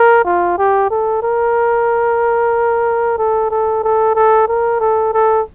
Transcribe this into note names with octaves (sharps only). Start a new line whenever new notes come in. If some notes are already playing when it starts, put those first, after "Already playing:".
Already playing: A#4
F4
G4
A4
A#4
A4
A4
A4
A4
A#4
A4
A4